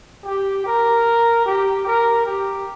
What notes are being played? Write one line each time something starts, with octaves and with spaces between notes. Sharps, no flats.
G4
A#4
G4
A#4
G4